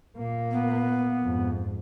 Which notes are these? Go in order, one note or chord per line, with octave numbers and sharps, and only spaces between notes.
A#2 A#3
B3
F2 G#2